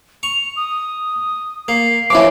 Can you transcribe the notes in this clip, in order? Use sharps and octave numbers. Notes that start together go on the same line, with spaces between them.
C#6 F7
D#6
A#3 C7
E3 F3 C#4 E4 D6